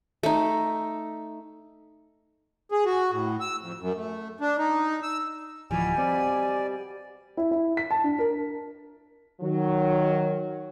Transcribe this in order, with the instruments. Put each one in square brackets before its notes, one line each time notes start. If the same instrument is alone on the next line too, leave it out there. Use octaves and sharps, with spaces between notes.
[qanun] A3 D#4
[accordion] G#4
F#4
A2
E6
F2
F#2
A3
D4
D#4
E6
[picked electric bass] D1 E3 F3 [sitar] B2 G3 [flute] G#5
[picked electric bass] C4 [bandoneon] D5
[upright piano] E4
E4
B6
A5
D4
A#4
[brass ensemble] D#3 F#3